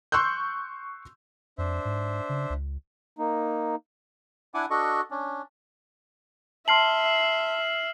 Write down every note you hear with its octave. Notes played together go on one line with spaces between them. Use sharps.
C6 C#6 E6 F#6 G6
F2 D4 C5 E5
G#2
C#3
C#2
A#3 D#4
D4 E4 F#5 G#5 D6
D4 F#4 A4 D#5 C#6
C#4 D4
E5 A5 C6 F6 C7 F#7